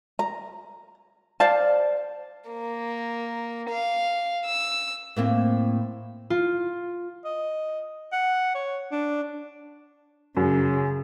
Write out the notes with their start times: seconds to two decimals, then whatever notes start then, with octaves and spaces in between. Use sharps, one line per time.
0.19 A#5
1.40 C5 D5 F5 A5
2.50 A#3
3.70 F5
4.46 E6
5.16 A2 A#3 C4
6.30 F4
7.25 D#5
8.13 F#5
8.55 C#5
8.92 D4
10.37 F#2 C#3